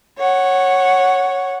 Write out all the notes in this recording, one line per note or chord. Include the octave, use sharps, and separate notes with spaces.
C#5 F#5